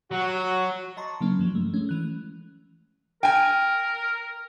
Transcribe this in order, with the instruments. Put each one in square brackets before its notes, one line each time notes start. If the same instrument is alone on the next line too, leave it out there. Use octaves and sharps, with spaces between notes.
[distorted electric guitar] F#3 [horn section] F#4
[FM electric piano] D#5 A5 A#5 C6 C#6
C#3 F#3 A#3 C#4
G2 F3 F#3
A3
G#3 A3 C#4
E3 F#6
[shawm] A#4 [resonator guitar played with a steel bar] G5 G#5